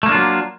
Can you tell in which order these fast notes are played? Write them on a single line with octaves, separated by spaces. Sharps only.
A3 A#3 D4 F4 F#3